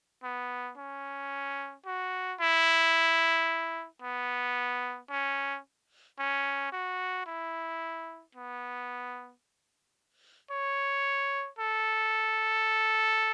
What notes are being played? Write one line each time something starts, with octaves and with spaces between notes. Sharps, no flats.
B3
C#4
F#4
E4
B3
C#4
C#4
F#4
E4
B3
C#5
A4